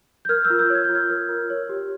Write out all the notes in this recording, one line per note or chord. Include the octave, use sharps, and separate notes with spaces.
G6
A#4 F6 G#6
E6 G6
F4
E6 G6
C#5
G#6
F4 G6
F6 G#6
A#4
F4
C#5
G4